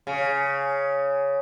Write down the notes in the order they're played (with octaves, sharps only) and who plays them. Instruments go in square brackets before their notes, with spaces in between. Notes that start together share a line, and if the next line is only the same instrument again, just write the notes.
[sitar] C#3